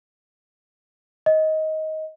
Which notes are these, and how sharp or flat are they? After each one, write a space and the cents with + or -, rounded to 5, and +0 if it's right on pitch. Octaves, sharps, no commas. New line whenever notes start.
D#5 +15